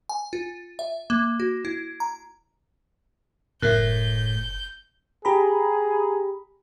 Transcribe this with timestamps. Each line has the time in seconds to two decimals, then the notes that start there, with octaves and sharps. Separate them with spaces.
0.09 G#5
0.33 F4
0.79 E5
1.10 A#3
1.40 F#4
1.65 E4
2.00 A#5
3.62 F#1 A2 A#4 E5 G6
5.25 G4 G#4 A#5 B5